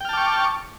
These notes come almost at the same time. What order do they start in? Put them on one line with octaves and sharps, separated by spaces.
G5 F6 A5 D6 C#6